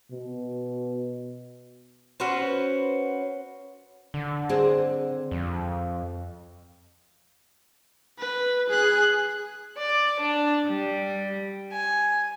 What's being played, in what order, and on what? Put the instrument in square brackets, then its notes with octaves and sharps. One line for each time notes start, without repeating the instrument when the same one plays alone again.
[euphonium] B2
[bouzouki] C#4 F#4 B4 C5
[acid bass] D3
[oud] C4 G#4
[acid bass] F2
[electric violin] B4
G#4 F#6
[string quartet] D5
D4
G3
G#5